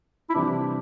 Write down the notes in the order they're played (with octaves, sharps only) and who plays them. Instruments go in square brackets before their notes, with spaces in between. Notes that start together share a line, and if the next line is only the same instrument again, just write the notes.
[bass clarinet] E4
[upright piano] C3 E3 G3 C4 [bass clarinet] D4